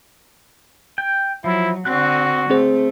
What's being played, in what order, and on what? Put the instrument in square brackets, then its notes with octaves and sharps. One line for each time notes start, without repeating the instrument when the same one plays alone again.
[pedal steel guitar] G5
[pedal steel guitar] F3 [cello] F#3 [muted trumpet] E4
[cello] D3 C4 [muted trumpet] F#4 [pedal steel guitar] F#6
[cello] A3 [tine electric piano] C4 G#4 C5